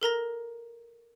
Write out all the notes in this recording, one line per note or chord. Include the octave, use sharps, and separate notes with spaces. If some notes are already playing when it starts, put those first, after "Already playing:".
A4 A#4 A#5 A#6